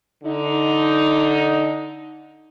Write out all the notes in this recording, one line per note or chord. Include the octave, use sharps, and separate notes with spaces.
D3 D#4